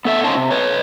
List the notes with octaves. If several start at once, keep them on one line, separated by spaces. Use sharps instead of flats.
B3 A4 E5
C3 C#4 D#4 F4 C5 A5
C3
B4 C#5